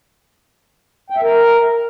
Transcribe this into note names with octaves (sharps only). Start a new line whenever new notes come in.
G5
E5
A#4